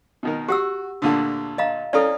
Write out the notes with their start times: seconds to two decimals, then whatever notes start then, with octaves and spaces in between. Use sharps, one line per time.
0.23 B2 D#3 A#4
0.48 F#4 G4 F#5 E6
1.02 D2 A#2 D3
1.58 D#5 F5 A#5
1.93 C#4 E4 A4 D5 F5 A#5